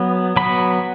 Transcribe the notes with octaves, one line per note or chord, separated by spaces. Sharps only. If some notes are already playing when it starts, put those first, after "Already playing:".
Already playing: F#3 B3
F#3 B3 B5